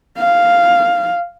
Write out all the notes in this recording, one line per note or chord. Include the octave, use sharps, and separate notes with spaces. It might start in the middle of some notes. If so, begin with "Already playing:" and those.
F5